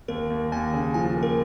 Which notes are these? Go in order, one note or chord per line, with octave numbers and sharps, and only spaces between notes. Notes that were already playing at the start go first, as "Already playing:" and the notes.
D#2 A#4
D#2
D#2 G#5
C#3
F3 G#5
A#3
A#4